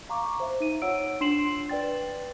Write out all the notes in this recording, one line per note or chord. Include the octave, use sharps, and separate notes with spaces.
F5 A#5 C#6 D6
C5 E5
D#4 D#7
F4 C#5 F#5 E6 D7
D4 C6 C7 E7 F#7
B4 D5 G5 A6